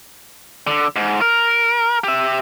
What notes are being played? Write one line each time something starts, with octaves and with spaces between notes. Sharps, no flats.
D3
G#2
A#4
G4 E5